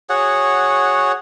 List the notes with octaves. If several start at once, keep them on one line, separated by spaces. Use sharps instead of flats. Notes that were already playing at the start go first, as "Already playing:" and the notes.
F#4 G#4 C#5 F#5